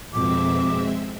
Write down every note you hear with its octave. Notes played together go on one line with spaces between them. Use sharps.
F2 B2 G#3 C4 E5 D6